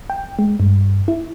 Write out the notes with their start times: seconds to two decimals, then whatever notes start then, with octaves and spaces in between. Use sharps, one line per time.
0.10 G5
0.39 G#3
0.60 G2
1.08 E4